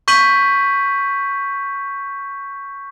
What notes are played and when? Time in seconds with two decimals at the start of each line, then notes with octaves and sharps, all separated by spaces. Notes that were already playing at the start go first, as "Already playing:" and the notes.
0.08 C#6 G6 B6 D#7 F#7